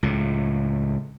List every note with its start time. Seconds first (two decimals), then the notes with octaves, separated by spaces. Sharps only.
0.03 C#2 A2